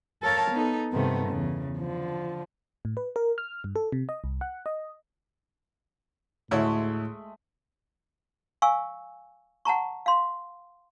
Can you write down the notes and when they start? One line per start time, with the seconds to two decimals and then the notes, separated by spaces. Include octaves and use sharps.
0.22 A4 A#4 C#5 F5 A5
0.52 B3 D#4 A4
0.92 G2 C3 D#3 A3 B3
1.29 E2 C#3
1.78 D3 F3
2.85 A2
2.97 B4
3.16 A#4
3.38 F6
3.64 G2
3.76 A4
3.92 C3
4.09 D#5
4.24 C2
4.41 F#5
4.66 D#5
6.51 D2 A2 G#3 A3 E4 C#5
8.62 F5 G#5 C#6 E6
9.65 F#5 A5 A#5 C#6
10.06 F5 C6